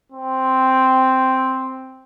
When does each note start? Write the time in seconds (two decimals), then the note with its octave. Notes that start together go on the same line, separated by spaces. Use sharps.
0.12 C4